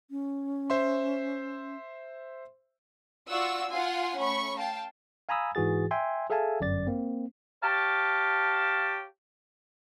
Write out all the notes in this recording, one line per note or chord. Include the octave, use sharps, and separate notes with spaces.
C#4
C5 E5 C6
F4 F#4 D5 F#5 C#6 E6
F4 F#5 G#5 C6
A3 C#4 B5 C#6
F5 G5 A5
F5 G#5 A#5 B5 D#6 E6
G#2 E3 F#4 G#4 A6
E5 G5 G#5 C6
G#4 A4 E5 F5 G#5 A5
G1 F#2 D5 A6
A#3 C4
G4 C#5 F5 A5